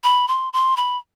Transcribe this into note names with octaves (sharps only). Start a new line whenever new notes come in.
B5
C6
C6
B5